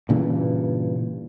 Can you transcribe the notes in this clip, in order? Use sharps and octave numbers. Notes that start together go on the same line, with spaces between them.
G2 A#2 C#3 E3